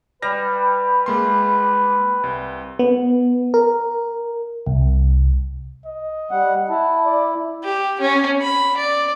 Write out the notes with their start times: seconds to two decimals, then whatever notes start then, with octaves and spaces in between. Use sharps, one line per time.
0.22 G3 B4 A#6
1.06 G#3 A#3 C6
2.24 C2
2.79 B3
3.54 A#4
4.67 C2
5.85 D#5
6.31 G3 F#5
6.70 E4 A5
7.05 D5
7.64 G4
8.00 C#4
8.42 B5
8.77 D5